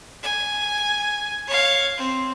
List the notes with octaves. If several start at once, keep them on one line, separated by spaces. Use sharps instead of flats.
G#5
C#5 F5
C4